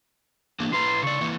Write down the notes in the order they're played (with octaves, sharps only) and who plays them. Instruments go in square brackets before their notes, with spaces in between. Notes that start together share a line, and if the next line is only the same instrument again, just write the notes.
[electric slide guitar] E3 A#3 D4
[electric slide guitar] E4 B4 A#5 [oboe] C6
[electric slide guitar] C#3 D5 [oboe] C#6
[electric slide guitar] E3 A#3 E4